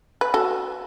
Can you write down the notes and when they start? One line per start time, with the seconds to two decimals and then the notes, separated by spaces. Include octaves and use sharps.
0.21 B4
0.34 F#4 A4